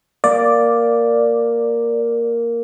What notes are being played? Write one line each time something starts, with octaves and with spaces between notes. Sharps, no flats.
A#3 D5